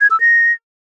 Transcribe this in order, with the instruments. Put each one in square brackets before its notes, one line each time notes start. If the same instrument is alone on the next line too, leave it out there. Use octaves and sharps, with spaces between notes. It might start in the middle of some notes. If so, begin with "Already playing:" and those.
[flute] G#6
E6
A#6